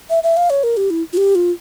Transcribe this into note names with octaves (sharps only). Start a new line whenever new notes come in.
E5
E5
F5
C#5
A#4
G4
E4
F4
G4
F4